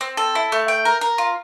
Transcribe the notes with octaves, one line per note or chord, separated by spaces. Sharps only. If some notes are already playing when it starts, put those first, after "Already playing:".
C4
A4
E4
A3
G5
A#4
A#4
F4